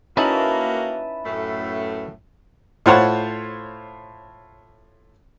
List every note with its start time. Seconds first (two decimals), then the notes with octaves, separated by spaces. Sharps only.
0.17 A#3 C#4 D#4 E4 F#4 B4 E5 A5
1.25 F#2 A2 A3
2.86 A2 F4 C5 C#5 F#5 A5